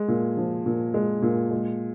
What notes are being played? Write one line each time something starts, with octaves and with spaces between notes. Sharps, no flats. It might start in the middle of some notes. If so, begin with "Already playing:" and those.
Already playing: G#3
A#2
F3
A#2
G#3
A#2
G#3